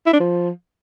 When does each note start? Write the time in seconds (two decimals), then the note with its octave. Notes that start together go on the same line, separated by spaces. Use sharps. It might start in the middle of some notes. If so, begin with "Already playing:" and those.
0.06 E4
0.13 D4
0.20 F3